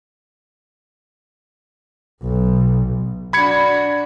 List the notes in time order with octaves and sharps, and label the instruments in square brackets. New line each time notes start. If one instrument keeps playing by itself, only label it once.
[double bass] B1
[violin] D4 F#4 [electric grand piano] B5 G#6 C#7